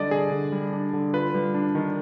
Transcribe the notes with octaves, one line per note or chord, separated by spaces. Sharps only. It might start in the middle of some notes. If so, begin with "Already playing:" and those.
Already playing: D3 G3 D4 D5 D#5
D3 G#4
D3
G3
D4
D3
F4 B4
G3
D4
D#3